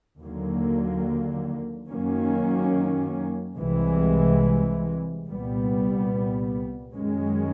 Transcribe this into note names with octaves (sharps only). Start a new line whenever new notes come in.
D#2 D3 F#3 A#3
F#2 D#3 F#3 A#3 C#4
C2 C3 E3 G#3
C2 A#2 G3 B3
F#2 D#3 G#3 C#4